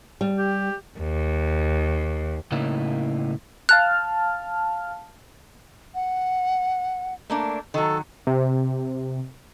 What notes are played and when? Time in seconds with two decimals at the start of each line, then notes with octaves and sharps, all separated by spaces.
0.21 G3
0.39 G4
0.99 D#2
2.52 A2 C#3 A#3 D#4 E4
3.69 F5 A5 F6 F#6
5.95 F#5
7.30 A3 A#3 D4
7.74 D#3 F#3 A4
8.27 C3